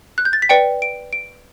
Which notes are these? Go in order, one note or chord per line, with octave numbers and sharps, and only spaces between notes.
F#6
G6
A6
B6
B4 D5 G5 C#7
D7
D7